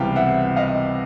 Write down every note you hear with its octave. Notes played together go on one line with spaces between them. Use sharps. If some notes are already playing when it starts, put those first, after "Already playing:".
Already playing: C#2 C3 E3 G3 B3 F5 G5
E5 F#5
D#5 F5